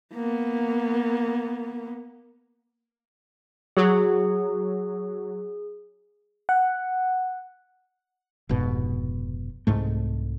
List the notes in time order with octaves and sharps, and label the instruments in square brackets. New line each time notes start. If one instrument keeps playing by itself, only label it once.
[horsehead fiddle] A#3 B3
[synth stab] F#3 [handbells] G#4
[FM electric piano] F#5
[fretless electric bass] F1 G#2 B2
C2 G#2 A3